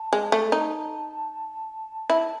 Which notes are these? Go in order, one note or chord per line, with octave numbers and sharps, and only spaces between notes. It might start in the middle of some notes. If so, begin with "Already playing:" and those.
Already playing: A5
G#3
A3
D#4 A5
E4 A5